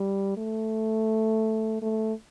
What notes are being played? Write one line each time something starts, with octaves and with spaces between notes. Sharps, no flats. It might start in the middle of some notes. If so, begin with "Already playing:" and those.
Already playing: G3
A3
A3